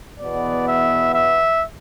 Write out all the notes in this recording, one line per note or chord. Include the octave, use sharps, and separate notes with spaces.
E2 B2 B3 D5
E5
E5